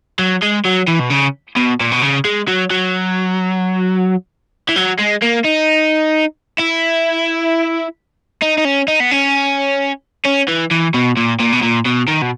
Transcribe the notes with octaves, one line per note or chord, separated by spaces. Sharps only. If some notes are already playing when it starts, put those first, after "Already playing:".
F#3
G#3
F#3
E3
B2
C#3
B2
A#2
B2
C#3
G#3
F#3
F#3
E3
F#3
G#3
A#3
D#4
E4
D#4
D#4
C#4
D#4
B3
C#4
C#4
E3
E3
B2
A#2
A#2
B2
A#2
B2
D#3
B2